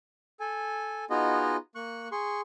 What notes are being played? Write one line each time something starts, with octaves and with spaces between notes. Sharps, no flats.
A4 G#5
B3 D#4 F4 F#4 G#4 D#5
A#3 C#6 F#6
G#4 C6 C#6